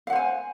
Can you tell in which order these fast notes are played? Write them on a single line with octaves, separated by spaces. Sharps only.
F5 F#5 C5 G#5